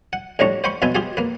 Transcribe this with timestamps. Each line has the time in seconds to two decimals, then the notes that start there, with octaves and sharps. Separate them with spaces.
0.13 F#5
0.39 A2 F3 G3 D4 A#5 C#6
0.64 C5 F5 G5 B5 C#6
0.82 B2 F3 F4 B4 E5 G#5
0.95 F4 G4 G#4 F5
1.17 A#3 B4